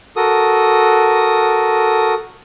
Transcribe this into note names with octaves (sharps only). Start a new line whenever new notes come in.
F#4 A4 A#4 D#6